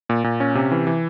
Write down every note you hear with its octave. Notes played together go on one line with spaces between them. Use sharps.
A#2
A#2
C#4
C3
E3
E3